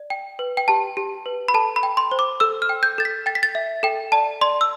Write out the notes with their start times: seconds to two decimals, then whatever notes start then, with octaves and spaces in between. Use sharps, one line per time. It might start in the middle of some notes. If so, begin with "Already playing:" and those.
Already playing: D5
0.10 G5
0.39 B4
0.57 G5
0.68 G4 A5
0.97 G4
1.26 B4
1.48 B5
1.54 A4 A5
1.76 B5
1.83 G5
1.97 C6
2.11 C5
2.19 D6
2.40 A4 E6
2.62 F6
2.69 G5
2.83 G6
2.98 A4 A6
3.05 B6
3.26 G5 A6
3.35 B6
3.43 A6
3.55 E5
3.83 A4 G5
4.12 D5 A5
4.41 D5 C6
4.61 E6